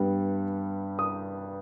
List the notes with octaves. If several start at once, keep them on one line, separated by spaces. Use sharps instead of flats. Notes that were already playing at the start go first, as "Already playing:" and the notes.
Already playing: G2 G3 B3
D#6